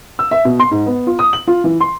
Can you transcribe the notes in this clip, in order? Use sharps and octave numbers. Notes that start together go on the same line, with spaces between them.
E6
E5
B2
C6
G#2
B3
F4
D#6
F#7
F4
E3
C6